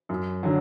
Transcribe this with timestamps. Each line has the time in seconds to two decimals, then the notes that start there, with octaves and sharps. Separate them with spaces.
0.09 F#2
0.43 D3 F#3